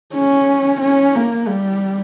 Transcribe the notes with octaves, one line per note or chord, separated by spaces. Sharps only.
C#4
C#4
A#3
G3